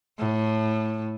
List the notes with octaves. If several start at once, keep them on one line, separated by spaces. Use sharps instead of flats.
A2